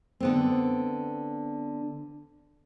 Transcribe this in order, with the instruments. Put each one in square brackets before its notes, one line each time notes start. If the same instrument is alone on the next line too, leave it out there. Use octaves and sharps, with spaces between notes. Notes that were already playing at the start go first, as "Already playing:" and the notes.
[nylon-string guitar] D3 B3 C4